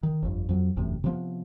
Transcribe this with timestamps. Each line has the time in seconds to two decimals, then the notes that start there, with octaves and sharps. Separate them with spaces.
0.03 D#3
0.22 G1 F2
0.49 F2 F#3
0.76 F#1 E2 A2 C3
1.04 C3 F3 B3